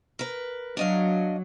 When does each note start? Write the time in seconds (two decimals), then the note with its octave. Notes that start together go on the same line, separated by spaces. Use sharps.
0.19 A#4 B4
0.77 F#3 D4 D#5 F5